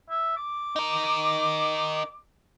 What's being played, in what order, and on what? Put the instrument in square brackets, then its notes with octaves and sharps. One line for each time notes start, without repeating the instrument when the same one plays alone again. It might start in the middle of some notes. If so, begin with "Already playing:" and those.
[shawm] E5
D6
[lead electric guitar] D#4 A#4